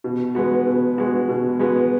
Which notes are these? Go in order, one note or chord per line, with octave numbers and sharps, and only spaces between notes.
B2
G#3 B3 F#4
B2
G#3 B3 F#4
B2
G#3 B3 F#4